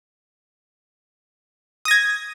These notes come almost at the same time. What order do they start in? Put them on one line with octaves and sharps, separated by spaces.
D#6 A#6 G#6